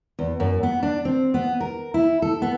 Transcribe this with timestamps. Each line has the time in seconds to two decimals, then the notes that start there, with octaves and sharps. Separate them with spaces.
0.19 E2
0.40 F#2
0.63 B3
0.83 D4
1.05 C4
1.34 B3
1.61 A#4
1.94 E4
2.22 A4
2.42 B3